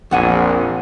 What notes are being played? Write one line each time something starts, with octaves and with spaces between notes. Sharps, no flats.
A#1 F2 F#5 G#5